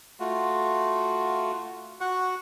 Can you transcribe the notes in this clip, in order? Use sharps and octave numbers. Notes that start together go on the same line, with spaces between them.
A3 F4 F#4
F#4 F#5 C#6